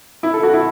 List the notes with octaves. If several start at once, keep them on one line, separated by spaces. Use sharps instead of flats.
E4
A4
F#4
E4